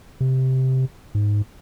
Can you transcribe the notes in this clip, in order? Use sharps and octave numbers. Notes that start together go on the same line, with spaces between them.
C3
G#2